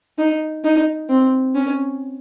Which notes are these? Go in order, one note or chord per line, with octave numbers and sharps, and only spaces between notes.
D#4
D#4
C4
C#4